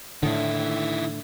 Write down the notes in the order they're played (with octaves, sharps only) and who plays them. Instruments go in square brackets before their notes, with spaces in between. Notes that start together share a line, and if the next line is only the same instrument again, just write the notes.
[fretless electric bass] A2 D3 [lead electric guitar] D#3 E4